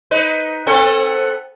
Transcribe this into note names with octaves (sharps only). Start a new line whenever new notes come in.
D#4 B4
B3 C4 A4